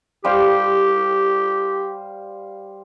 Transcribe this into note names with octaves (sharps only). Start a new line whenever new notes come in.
G3 G4 C5 F5